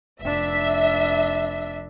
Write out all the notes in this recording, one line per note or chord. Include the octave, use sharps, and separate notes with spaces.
F1 D4 E5